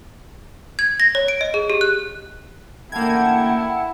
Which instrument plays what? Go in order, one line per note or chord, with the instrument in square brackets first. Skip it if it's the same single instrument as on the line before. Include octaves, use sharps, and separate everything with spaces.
[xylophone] G#6
A#6
C#5
D7
D#5
G#4
G4
F#6
[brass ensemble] A1 D3 G5 [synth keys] A#3 G#6 [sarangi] E4 [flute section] F#5 A5